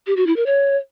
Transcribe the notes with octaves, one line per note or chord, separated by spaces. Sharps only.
G4
F#4
E4
A#4
C#5